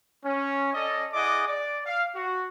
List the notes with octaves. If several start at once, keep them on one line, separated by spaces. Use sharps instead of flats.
C#4
C#4 A4 D5 D#5
E4 G#4 D5 D#5 F#5 D6
D5 D6
F5
F#4